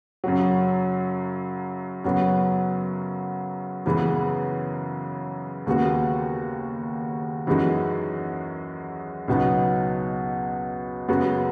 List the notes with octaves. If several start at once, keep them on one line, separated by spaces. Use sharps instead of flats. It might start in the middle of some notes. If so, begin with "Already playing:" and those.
F#2 C#3 F#3
F#2 C#3 F#3 B3
F#2 C#3 E3 G#3 B3
D#2 C#3 G#3 B3 F#4
F#2 E3 G#3 D#4 F#4
C#2 B2 F#3 B3 D#4
F#2 C#3 G#3 B3 F#4